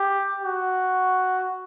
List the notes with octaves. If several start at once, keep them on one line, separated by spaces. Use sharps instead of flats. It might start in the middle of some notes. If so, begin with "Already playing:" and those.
Already playing: G4
F#4